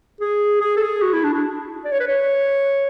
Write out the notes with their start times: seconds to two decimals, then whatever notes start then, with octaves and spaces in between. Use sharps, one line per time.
0.20 G#4
0.61 G#4
0.77 A4
0.82 G#4
1.02 F#4
1.13 E4
1.23 D4
1.34 D4
1.85 D5
1.92 C#5
2.00 B4
2.07 C#5